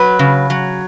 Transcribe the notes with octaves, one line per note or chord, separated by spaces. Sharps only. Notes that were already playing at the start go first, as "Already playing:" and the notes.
Already playing: F#3 B4
C#3
F#3